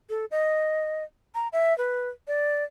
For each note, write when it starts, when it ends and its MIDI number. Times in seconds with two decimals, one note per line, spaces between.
0.10 0.25 69
0.31 1.04 75
1.35 1.48 82
1.53 1.76 76
1.78 2.10 71
2.28 2.64 74